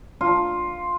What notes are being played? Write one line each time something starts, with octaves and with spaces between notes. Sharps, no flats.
F4